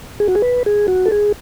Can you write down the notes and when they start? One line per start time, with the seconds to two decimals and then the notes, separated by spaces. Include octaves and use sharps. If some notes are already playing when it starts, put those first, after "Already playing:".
0.20 G#4
0.28 F#4
0.35 G#4
0.42 B4
0.66 G#4
0.88 F#4
1.06 A4
1.12 G#4